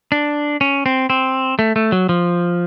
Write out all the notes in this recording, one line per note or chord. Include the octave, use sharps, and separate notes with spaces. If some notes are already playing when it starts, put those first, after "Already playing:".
D4
C#4
C4
C4
A3
A3
F#3
F3